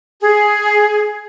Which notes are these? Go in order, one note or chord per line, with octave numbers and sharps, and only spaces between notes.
G#4